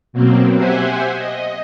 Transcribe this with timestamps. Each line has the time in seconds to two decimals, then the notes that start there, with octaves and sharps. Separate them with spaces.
0.13 B2 F#3 A#3 C4
0.55 G4 C5 E5 F#5 G#5
1.15 D#5